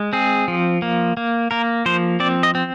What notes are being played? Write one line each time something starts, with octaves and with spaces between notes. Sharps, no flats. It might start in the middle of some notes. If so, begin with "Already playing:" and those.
Already playing: G#3
C4 G#4
F3
A#3
A#3
A#3 A#4
F3 C5
C4 D5
D#5
C4